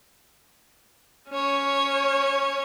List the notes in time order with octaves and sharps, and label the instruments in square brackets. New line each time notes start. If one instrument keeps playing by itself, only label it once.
[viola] C#4 C#5